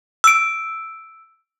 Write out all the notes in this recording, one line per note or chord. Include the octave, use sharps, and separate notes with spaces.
E6 D7